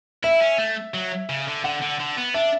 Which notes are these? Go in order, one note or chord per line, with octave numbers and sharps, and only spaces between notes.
E4 E5
C#4
A3
F#3
C#3
D3
D3 F#5
D3
D3
B3
D4 E5